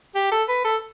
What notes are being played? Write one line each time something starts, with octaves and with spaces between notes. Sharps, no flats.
G4
A4
B4
A4